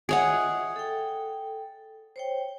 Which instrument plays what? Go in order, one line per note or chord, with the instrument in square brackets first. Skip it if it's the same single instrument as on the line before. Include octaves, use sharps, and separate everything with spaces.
[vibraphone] F4 D#5 E5 [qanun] G#4 C#5 F#5
[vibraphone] A4 G5
C5 C#5 G5